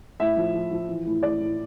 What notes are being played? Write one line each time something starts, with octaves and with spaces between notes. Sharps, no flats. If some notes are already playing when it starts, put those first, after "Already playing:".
A2 E5
F3
F3
F3
E3
A2
A2 D5
A2